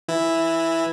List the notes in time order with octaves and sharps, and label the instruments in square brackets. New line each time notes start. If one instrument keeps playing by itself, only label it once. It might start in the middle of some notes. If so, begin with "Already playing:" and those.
[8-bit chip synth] E3 E4